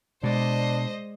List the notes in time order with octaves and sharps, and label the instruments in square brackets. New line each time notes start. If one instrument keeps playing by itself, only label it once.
[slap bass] B2 [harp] G#3 D5 [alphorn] D4 [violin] C5 D#5